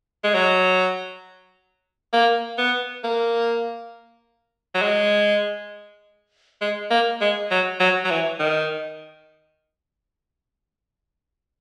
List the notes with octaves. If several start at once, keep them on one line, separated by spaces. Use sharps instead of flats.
G#3
F#3
A#3
B3
A#3
F#3
G#3
G#3
A#3
G#3
F#3
F#3
F#3
E3
D#3